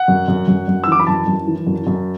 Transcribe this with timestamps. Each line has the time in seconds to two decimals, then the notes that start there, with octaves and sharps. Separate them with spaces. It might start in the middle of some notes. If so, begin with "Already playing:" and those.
Already playing: F#5
0.08 F#2
0.28 F#2
0.48 F#2
0.68 F#2
0.84 E6
0.87 E3 D6
1.00 B5
1.07 F#2 A5
1.27 F#2
1.47 E3
1.67 F#2
1.87 F#2